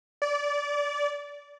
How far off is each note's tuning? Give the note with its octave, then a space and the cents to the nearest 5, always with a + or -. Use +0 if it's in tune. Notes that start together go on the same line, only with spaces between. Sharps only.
D5 -20